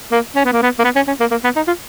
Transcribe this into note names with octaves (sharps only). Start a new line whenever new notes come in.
A#3
C#4
B3
A#3
B3
A#3
B3
C#4
C#4
A#3
A#3
B3
D#4
F4